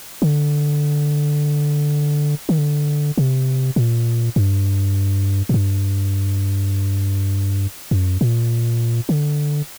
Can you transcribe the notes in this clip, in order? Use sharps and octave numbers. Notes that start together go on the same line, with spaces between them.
D3
D#3
D3
C3
A#2
G2
A2
G2
F#2
A#2
D3